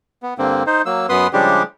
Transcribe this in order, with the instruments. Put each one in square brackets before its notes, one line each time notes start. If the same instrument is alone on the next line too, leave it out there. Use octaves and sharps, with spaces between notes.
[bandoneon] B3
G2 D3 A#3 C4
D#4 C5
F#3 A#3 E6
F#2 B3 B4 C6 D#6
C#3 F3 G3 G#3 D4 G4